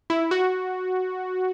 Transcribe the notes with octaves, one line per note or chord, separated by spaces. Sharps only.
E4
F#4